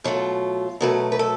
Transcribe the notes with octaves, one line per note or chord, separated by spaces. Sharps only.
B2 F#3 A3 F4
B2 F#3 A3 B4
B4
A4